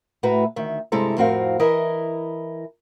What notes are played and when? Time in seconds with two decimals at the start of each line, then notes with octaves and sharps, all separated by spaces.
0.23 A2 E4 F#4 B4 A#5
0.56 D2 D#3 E5
0.92 G2 C3 G#3 E4 A4 A#5
1.17 F2 A2 C4 F#4 A#4 F5
1.59 E3 E4 A#4 D#5